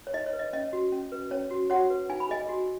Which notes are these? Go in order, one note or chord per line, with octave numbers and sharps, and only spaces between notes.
C#5
D#4 D#5
C#5
B4
D#5
C#4 D#5
F#4
C#4
B4
C#4 C#5
F#4
F#4 C#5 F#5
B4
D#4 G#5
B5
G#4 D#5 G#5
F#4